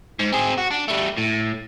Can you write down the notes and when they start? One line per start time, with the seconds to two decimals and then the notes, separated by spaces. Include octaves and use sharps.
0.19 G#2
0.32 C4 G#4
0.58 F#4
0.71 D4
0.88 G3 A3
1.17 A2